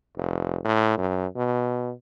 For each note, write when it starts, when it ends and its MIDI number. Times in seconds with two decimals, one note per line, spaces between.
0.17 0.59 29
0.64 0.94 45
0.97 1.27 42
1.36 1.92 47